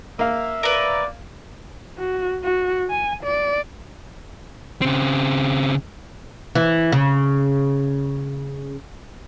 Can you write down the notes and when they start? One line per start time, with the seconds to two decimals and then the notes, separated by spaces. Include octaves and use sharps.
0.19 A#3 E5 F5
0.63 A#4 B4 D5
1.99 F#4
2.44 F#4
2.90 G#5
3.24 D5
4.82 C#3 C4
6.55 E3
6.92 C#3